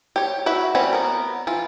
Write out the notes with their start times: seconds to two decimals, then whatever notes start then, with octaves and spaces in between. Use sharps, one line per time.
0.16 G4 C#5
0.46 E4 F#4 B4 E5
0.75 G3 C4 C#4 F#4 B4
0.93 B3 A#4
1.47 E3 F4